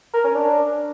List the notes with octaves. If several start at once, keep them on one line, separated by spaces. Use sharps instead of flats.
A#4
C#4
D4